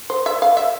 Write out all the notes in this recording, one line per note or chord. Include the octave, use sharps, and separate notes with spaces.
C5
E5
F5
E5